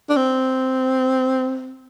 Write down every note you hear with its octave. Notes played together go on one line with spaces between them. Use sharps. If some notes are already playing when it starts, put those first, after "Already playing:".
D4
C4